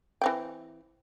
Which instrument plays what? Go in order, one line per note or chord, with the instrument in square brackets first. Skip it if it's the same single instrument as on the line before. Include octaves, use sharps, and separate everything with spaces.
[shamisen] E3 C4 G5